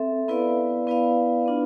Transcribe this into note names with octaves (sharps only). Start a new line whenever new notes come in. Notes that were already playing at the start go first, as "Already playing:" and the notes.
Already playing: C4 A4 E5
B3 E4 B4 D5 F5
B3 E4 B4 D5 F5
B3 D4 F4